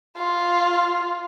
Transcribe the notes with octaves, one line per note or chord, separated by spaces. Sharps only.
F4